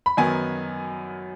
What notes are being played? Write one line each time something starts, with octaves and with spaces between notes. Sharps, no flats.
B5
F#2 D#3 F#3 B3 G#5